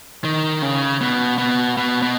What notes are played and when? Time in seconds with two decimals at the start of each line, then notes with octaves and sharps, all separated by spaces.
0.24 D#3
0.62 C#3
1.01 B2
1.38 B2
1.77 B2
2.02 B2